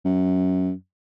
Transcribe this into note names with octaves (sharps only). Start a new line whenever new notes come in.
F#2